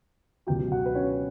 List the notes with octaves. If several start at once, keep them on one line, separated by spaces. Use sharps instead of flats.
C#2 B2 F#3 G4 G5
F#4 F#5
B4
C#4 C#5